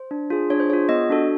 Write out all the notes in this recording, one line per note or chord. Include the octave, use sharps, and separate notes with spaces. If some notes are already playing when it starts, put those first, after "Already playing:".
Already playing: C5
D4
F4 G#4
D4 C#5
C5
F4 G#4 C#5
B3 D#5
D4 F#4 A4